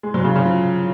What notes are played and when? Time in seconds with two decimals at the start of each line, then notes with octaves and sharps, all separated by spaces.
0.03 G#3
0.14 F#3
0.24 C#3
0.35 C#3
0.45 F3